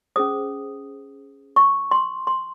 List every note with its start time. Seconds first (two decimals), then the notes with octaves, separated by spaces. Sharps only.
0.16 C#4 G#4 C5 D#6
1.56 C#6
1.91 C6
2.27 C6